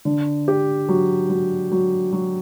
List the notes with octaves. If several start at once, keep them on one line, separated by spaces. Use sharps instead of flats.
D3
G4
F#3
F#3
F#3
F#3